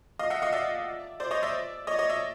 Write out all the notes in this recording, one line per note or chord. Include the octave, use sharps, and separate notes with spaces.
D#5 F5
E5 F#5
D#5 F5
D5 E5
C5 D5
C#5 D#5
D5 E5
C#5 D#5
D5
C#5 D#5
D5 E5